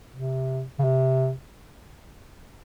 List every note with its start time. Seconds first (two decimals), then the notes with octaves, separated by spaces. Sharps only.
0.14 C3
0.79 C#3
0.84 C3